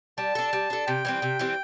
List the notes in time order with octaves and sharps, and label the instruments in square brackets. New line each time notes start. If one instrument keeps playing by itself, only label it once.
[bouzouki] G3 [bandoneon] A5
[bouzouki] D4 A4
G3
D4 A4
[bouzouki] C3 [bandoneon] G5
[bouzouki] E3 G3 C4
C3
E3 G3 C4